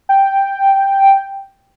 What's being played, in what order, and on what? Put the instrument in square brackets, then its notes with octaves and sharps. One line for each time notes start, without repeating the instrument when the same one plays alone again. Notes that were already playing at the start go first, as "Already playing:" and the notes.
[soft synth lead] G5